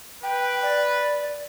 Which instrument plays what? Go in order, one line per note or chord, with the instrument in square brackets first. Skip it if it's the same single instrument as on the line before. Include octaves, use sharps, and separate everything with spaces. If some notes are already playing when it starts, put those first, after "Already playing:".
[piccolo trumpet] B4 [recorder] G5
[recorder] D5